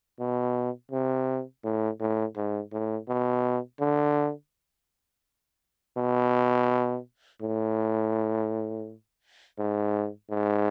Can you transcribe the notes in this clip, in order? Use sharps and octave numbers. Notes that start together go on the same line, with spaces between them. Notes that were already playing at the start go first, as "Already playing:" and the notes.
B2
C3
A2
A2
G#2
A2
B2
D3
B2
A2
G#2
G#2